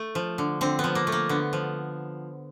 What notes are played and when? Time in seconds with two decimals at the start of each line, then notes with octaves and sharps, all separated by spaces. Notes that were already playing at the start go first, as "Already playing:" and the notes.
Already playing: A3
0.15 F3
0.38 D3
0.61 D3 C4
0.79 B3
0.84 F3
0.95 A#3
1.07 A3
1.12 A#3
1.29 D3 B3
1.53 F3